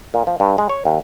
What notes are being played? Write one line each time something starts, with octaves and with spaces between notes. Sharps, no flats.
A#2
F3
G2
G#3
C#5
D#2